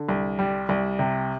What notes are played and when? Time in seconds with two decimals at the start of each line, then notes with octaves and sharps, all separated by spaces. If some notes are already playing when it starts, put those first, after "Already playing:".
Already playing: D3
0.09 C2
0.39 G3
0.69 C2
0.99 C3